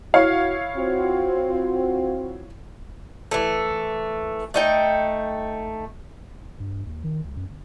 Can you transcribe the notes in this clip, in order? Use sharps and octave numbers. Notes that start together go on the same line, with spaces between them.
E4 F#4 C#5 F5
C4 F4 F#4
E3 A3
A3 D#4 G5
G2
D#2
D#3
C#2
F#2
G1